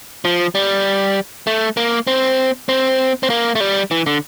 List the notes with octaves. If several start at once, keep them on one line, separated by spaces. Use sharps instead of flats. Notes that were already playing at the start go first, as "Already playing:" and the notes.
F3
G3
A3
A#3
C4
C4
C4
A#3
A3
G3
E3
D3